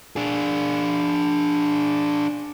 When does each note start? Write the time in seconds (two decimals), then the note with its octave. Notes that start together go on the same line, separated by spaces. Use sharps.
0.16 D4 G#4